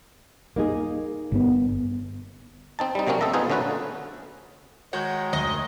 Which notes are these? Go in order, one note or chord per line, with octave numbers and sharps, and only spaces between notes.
A#3 D#4 G#4
G1 B3
C4 D#4 A5
G3 D#4
C3 F#3 A#3 C4 C#4
A4 D#5 E5 A#5
B3 D#4 F4 G#4 B4 C5
D3 A3 C#4 F#4 B4
D#3 G#3 F#4 C#5 F#5 G5
D2 D#5